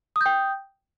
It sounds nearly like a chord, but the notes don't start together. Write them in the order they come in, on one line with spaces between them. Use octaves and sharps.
D#6 G6 G5